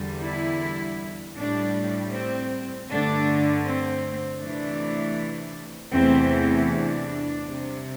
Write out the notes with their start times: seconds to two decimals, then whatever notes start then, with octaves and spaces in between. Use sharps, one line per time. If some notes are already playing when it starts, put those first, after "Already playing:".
Already playing: E2 D3 G3
0.22 E4
1.37 A2 G3 D4
2.13 C4
2.90 G2 D3 A3 D4
3.66 C4
4.42 C3 E3 A3 D4
5.95 E2 C3 E3 A3 C4
6.71 D4
7.47 C3 G3